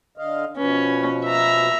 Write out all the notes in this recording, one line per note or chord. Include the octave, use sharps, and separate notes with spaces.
D3 D#5 F5
B2 F3 C#4 B4
E5 A#5